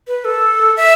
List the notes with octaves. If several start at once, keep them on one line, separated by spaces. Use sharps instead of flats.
B4
A4
E5